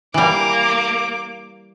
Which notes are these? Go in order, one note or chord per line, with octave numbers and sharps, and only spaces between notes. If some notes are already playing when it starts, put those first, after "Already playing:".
E3 G3 A#3 D6